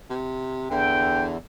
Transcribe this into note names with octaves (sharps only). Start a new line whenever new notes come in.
C3
E2 D3 E3 G5